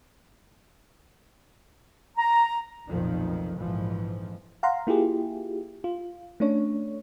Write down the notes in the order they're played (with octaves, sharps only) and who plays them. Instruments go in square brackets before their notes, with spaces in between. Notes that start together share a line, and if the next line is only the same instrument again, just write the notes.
[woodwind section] A#5
[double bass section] F1 B1 F2 A#2 D#3 F3
A#1 F2 G#2 E3 F3
[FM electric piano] F5 F#5 A#5 C6
A#3 E4 F4 G4 G#4
F4
A3 C#4 D4 C#5